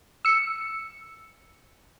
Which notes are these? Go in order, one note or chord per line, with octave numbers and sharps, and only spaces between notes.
E6 C#7